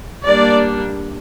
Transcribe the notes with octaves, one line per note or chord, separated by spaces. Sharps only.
G3 A#3 D4 D5